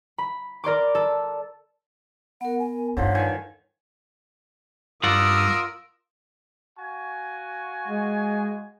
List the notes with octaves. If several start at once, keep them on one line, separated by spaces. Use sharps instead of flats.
B5
A#4 D5 C6 D6
A4
B3 A#4 F#5
G#5
E2 G2 D3 D#3 F3 A3 C#5
D#3 B4 D5 G#5
G2 F4 A#4 D5 F#5 D#6 E6
F#4 F5 G#5
G#3